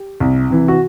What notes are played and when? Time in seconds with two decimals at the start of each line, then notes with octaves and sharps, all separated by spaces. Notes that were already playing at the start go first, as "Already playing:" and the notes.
Already playing: G4
0.20 C2
0.50 C3 E3
0.68 F#4